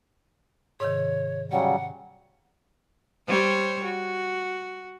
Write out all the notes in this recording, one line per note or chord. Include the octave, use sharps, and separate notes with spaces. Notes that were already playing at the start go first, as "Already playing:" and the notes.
G#2 C3 D#3 C#5
C#3 F#3 G3 F#5
G3 C5 C#5
F#4